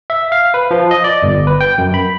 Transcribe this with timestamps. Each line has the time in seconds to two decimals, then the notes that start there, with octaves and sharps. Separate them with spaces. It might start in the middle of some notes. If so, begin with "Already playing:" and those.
0.10 E5
0.32 F5
0.54 B4
0.71 F3
0.91 D#5
1.04 D5
1.23 G1
1.47 B4
1.61 G5
1.78 F#2
1.94 B5